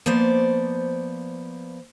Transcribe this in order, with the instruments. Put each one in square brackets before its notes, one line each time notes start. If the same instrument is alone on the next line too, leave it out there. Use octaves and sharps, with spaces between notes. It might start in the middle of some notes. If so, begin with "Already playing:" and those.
[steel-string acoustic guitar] F3 A#3 B3 C5 D5